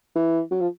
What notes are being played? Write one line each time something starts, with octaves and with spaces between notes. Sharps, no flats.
E3
F#3
F3